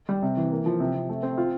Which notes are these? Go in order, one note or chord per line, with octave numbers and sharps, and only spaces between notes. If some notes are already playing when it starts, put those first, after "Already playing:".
G3
C3
E3
A#3
F3
C3
C3
A3
C4
F4